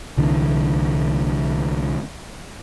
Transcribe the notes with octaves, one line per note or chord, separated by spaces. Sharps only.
C2 D3 E3